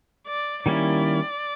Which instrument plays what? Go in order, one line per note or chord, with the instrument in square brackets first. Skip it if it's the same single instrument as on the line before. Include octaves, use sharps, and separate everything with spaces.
[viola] D5
[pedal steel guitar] D#3 G3 A#3 C#4 E4 [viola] D5